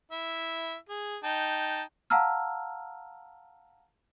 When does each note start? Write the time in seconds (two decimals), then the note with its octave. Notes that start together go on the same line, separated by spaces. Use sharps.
0.12 E4 E5
0.89 G#4
1.24 D#4 G5 A5
2.10 F5 F#5 A5 A#5 E6 F6